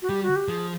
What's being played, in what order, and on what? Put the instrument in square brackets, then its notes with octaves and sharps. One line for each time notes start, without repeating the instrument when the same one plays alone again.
[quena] F#4
[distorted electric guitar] G3 [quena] G4
[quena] F#4
G4
[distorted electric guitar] F3 [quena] G#4